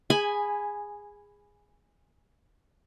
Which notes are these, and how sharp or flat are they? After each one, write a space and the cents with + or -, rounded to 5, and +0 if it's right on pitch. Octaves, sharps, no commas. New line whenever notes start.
G#4 -15 G#5 +0 B5 +5